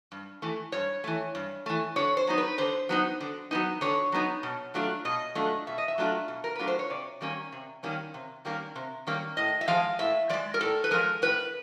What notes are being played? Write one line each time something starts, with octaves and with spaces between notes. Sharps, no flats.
G2
E3 A3
G2 C#5
E3 A3
G2
E3 A3
D3 C#5
C5
F#3 B3 D#4
B4
D3 C5
F#3 B3 D#4
D3
F#3 B3 D#4
D3 C#5
F#3 B3 D#4
B2
F#3 A3 D4 F4
B2 D#5
F#3 A3 D4 F4
B2 E5
D#5
E5
F#3 A3 D4 F4
B2
A#4
F#3 A3 D4 F4 B4
C5
C#5
C3 D5
D#3 G3 A#3 C#4
C3
D#3 G3 A#3 C#4
C3
D#3 G3 A#3 C#4
C3
D#3 G3 A#3 C#4
A2 D#5
E5
F3 G#3 F5
A2 E5
F3 G#3 D5
A#4
A2 A4
B4
F3 G#3 A#4
A2 B4